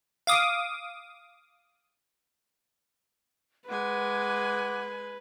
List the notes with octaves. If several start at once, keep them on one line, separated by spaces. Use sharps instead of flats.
F5 D6 D#6
G#3 B4 F#5 G#5 D6 F#6